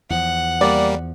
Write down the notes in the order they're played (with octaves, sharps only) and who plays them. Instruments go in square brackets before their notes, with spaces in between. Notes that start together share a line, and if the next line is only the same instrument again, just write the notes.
[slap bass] E2 F3 [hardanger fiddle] F#5
[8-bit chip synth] G3 A#3 [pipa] D5